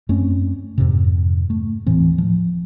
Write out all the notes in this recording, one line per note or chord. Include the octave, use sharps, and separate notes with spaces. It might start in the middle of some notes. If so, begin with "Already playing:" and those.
F#2 A3 C4 C#4
F2 G#2 C3
A3
D#1 A2 E3 C4
F3